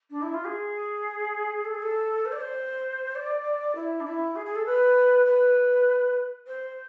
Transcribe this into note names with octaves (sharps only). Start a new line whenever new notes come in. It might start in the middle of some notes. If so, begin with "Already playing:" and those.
D4
E4
F4
G#4
A4
G#4
A4
C5
D5
C5
D5
E4
D4
E4
G#4
G#4
A4
B4
B4
C5